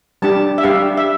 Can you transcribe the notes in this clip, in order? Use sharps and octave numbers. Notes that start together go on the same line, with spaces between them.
G3 D4 G4 A5
E5
G3 D4 G4 F5
E5